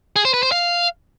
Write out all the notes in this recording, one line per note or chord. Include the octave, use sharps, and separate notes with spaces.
G#4
C5
B4
C5
F5